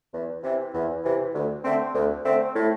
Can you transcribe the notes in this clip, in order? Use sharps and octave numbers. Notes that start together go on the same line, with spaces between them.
E2
C3 E3
E2
C3 E3
D2
D3 A3 C4
D2
D3 A3 C4
A2